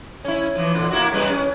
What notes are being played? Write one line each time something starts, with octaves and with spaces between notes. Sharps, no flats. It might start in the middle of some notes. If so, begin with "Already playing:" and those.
C#4 E4
E3 F3
A#2 D3
A#3 E4 F#4
C#3 G3 B4
C#4